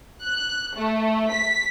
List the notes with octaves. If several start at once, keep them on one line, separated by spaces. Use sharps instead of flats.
F#6
A3
B6